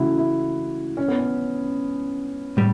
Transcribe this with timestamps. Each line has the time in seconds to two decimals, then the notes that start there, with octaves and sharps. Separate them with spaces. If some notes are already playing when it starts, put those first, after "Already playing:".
Already playing: C#3 E3 A3 E4 F#4
0.18 E4
0.97 C#4
1.08 B3
1.19 C#4
2.57 A2 G3